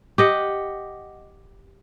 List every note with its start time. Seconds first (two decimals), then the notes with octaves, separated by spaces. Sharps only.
0.18 G4 D#5 F#5